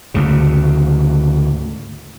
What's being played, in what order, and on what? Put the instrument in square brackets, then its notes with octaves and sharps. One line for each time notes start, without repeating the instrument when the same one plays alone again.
[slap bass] D2 G#2 C#3